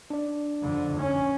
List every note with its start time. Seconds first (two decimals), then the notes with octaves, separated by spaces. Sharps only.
0.10 D4 D5
0.63 F2 D3
1.01 C#4